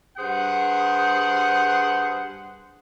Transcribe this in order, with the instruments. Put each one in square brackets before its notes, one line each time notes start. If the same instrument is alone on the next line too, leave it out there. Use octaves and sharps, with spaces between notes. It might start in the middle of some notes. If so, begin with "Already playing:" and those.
[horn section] G2 G#4 C5 F#5